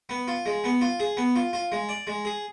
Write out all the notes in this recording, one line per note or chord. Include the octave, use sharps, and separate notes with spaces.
B3
F4
G#3
B3
F4
G#4
B3
F4
F4
G#3
D5
G#3
G#4